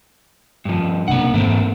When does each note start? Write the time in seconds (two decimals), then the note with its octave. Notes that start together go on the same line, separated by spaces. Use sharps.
0.65 G2 F3
1.08 B1 C3 A#3 D4 F#5
1.34 G#2 E3 A3 A#3 C4